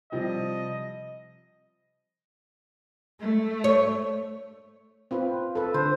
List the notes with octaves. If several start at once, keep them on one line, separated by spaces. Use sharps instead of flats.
C3 F3 G3 D#5
A3
C#5
C4 F4 B4
A4 B4
D3 C5